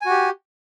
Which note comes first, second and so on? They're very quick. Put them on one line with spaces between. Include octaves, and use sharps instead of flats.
G#5 F#4 G4